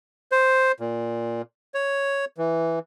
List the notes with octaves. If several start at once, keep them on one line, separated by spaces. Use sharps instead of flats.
C5
A#2
C#5
E3